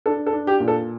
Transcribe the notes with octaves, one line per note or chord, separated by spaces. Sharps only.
D4 A4
A4
D4
G4
A#2
A4